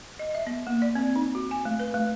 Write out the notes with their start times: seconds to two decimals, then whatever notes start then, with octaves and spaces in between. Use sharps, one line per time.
0.19 D#5
0.35 E5
0.47 B3
0.67 A#3
0.82 D5
0.95 C4
1.16 D#4
1.35 F#4
1.51 G#5
1.65 A3
1.80 B4
1.94 A3